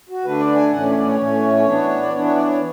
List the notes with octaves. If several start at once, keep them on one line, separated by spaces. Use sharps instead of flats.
F#4
D3 A3 D4 B4
D5
G#5
A2 E3 A3 C#4 F#5
D5
C#5
D5
C#5
A2 E3 A3 C#4
E3 B3 D4
D5
E3 B3 D4 C#5
C#5
D5
C#5